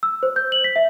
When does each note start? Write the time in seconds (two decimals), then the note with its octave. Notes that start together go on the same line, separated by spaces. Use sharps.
0.03 E6
0.23 C5
0.36 G6
0.52 F#7
0.64 B6
0.76 E5